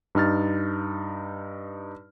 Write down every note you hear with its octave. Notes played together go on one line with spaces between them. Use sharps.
G2 D#4 F6 A6